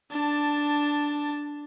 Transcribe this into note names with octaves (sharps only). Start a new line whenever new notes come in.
D4 A5